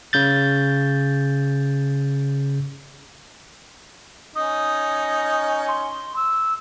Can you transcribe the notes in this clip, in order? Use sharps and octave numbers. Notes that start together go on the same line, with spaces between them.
C#3 G6 A6
C#4 D#4 D#6
C6
E6